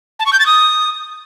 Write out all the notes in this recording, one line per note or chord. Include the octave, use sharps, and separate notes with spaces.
A5
C#6
G6
A6
D#6